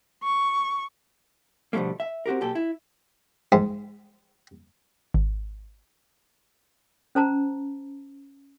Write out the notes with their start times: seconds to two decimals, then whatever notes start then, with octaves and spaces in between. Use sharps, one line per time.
0.23 C#6
1.73 B2 D3 F3 G3 A3 A#3
2.00 E5
2.26 C4 F#4 G4 A#4
2.41 B1 A#2 G4 A4
2.55 E4
3.52 G#2
5.14 G#1
7.15 C#4 C5 A5 A#5